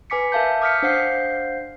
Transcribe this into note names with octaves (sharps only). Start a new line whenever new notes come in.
B4 G#5 D6 B6 C#7
A#4 E5 F5 A5 G6
D6 D#6 F6 G6 B6 C#7
D4 C5 F5 F#5 G6 C7